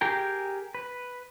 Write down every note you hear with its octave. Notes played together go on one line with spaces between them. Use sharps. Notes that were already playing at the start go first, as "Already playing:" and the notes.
G4 G#4 A#4 G5
B4